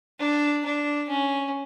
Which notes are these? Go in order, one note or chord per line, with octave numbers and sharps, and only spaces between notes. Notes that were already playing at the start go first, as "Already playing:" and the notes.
D4
D4
C#4